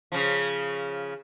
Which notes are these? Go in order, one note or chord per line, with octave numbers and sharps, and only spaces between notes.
C#3 F3